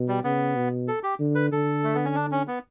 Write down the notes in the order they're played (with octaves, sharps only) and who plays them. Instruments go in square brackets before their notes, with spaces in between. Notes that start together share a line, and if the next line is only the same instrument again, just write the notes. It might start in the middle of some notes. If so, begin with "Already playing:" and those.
Already playing: [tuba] B2
[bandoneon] G3
[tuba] C#3 [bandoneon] B3
[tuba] B2
[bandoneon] A4
G4
[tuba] D3
[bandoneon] B4
[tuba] D3 [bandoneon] A4
[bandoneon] A3
B3
C#4
D4
C#4
B3